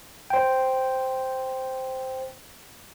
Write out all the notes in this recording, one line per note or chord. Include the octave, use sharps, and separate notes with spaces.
C5 G5